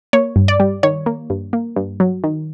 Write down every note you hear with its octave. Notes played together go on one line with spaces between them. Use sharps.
A#3 C#5
G2
D5
G3
D#3 C#5
A#3
G2
A#3
G2
F#3
D#3